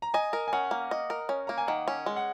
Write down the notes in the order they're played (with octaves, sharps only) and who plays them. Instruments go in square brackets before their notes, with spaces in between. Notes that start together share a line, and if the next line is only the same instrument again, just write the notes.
[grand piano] A#5
[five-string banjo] D#5 [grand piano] G#5
[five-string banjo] A#4
[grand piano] G#5
[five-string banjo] C#4 [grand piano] F#5
[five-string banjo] A#3
D#5
A#4
C#4
[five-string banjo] A#3 [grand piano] A#5
[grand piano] G#5
[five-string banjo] D#3 [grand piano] F#5
[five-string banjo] C#4
G#3
[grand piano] F#5